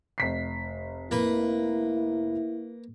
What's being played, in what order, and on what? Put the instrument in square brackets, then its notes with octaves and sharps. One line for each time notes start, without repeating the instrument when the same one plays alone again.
[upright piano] F1 B6 C7
[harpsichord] A#3 B4 [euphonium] E4